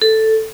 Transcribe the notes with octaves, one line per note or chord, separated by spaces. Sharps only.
A4